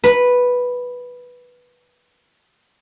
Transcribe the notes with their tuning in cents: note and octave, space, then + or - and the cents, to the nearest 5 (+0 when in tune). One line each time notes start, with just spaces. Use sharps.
B4 -5